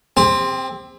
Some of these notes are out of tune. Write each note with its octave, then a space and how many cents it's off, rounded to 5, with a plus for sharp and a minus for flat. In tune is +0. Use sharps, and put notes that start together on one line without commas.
C4 +0 G4 +40